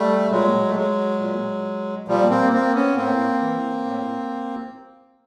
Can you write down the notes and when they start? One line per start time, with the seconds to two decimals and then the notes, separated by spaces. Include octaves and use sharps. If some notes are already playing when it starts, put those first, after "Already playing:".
Already playing: G3 A3
0.31 A#2 F#3 G#3
0.68 A3
0.75 F#3 G#3
1.19 A#2
2.08 A#2 F3 G3
2.30 A#3 C4
2.53 A#3 C4
2.74 B3 C#4
2.96 A2 A#3 C4
3.41 E3
3.85 A2